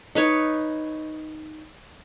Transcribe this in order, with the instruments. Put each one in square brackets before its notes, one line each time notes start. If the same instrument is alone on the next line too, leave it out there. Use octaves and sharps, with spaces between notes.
[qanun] D#4 B4 C#5